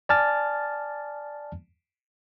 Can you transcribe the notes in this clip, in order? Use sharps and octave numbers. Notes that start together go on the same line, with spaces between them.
D5 G#5 A5 F6 A6